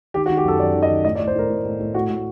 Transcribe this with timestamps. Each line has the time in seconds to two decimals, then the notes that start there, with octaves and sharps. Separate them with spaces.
0.14 D#3 G4
0.26 F#4
0.30 D#3
0.37 G4
0.45 F#2 A4
0.60 F#2 D5
0.75 D#3
0.83 D#5
0.89 D#3
1.05 A2 D#5
1.15 D5
1.20 A2
1.27 C5
1.35 A2 A#4
1.49 A2
1.65 A2
1.80 A2
1.94 A2 F#4
2.09 A2